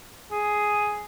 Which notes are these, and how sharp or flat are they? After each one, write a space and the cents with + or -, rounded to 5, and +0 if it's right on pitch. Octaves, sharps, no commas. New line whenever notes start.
G#4 +5